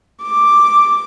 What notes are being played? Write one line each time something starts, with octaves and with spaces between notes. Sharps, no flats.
D6